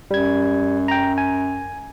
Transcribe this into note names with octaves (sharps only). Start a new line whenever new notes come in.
F#2 G3 G#6
G5 A#5
G#5